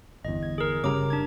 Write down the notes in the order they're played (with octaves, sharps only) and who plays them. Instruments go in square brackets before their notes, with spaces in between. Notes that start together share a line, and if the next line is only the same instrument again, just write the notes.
[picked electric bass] G1 E2 [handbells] D#5
[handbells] G#6
G#4 A#4
[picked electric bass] F#1 G2 G3 [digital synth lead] C#3 [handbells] A#4 A#5 D6
[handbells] D4 G#6